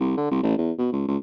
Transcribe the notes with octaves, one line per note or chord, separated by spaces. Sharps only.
C2
D3
C2
A1
E2
B2
C#2
C#2